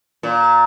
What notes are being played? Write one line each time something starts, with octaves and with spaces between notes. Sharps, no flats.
A#2